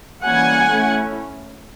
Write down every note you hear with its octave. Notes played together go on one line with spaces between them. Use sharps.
E3 G3 A#3 C#4 F#5 G#5
A3 C#4 E4